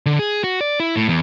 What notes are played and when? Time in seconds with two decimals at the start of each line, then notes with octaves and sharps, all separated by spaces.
0.06 D3
0.19 G#4
0.44 F#4
0.61 D5
0.80 E4
0.97 A2
1.09 E2